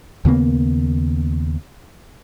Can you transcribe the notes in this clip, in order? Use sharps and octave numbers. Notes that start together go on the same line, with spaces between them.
D#2 C#3 A#3 B3